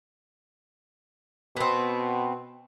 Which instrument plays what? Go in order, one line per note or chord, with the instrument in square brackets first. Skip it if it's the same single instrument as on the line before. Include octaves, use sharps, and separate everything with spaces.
[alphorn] B2 [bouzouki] B3 C4